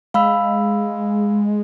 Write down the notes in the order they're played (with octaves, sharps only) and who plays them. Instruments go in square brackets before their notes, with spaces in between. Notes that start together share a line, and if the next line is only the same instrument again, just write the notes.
[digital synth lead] G#3 [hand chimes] F5 B5 E6